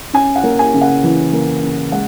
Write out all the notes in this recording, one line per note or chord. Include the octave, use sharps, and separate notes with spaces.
C#4 G#5
F#5
A#3
G#5
C#3
F#5
E3
A#3
C#3
G#3 F#5